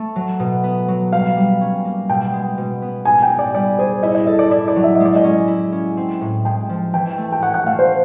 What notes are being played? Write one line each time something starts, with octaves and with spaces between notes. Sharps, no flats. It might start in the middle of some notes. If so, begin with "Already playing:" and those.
Already playing: A3
F#3
B2
B3
F#3
G3 F5
G3
C#4
A#3
B2 G5
G#3
B2
B3
D#4 G#5
G5
D#4
D5
G3 D5
G#4 C5
E4 D#5
D#5
A4 D#5
D5
E4 D5
D5
F#3
E5
D#5
G#3
D5
D#5
C#4
E4
C#4
C4
A2
G#3 G5
F3
E3 G5
A3
G5
C#4 F#5
F#5
A3 F5
C5